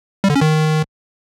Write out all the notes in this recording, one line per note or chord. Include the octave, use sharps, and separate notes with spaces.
G3
D3
C#4
D#3